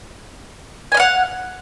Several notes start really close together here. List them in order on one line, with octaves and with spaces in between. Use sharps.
G#5 D#5 F5 F#5